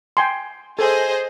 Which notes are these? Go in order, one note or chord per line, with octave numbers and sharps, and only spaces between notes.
G5 G#5 C6
G#4 A4 C5 D#5